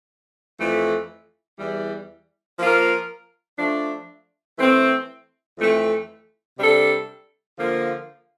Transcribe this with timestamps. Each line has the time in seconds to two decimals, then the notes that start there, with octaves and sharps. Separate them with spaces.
0.59 F2 E3 A3
1.59 E2 E3 G3
2.58 F3 A#3 F4 A#4
3.58 F3 A3 D4
4.58 E3 A3 C4
5.58 F2 E3 A3 C4
6.58 C3 G3 D4 A4
7.58 D3 F3 A#3 F4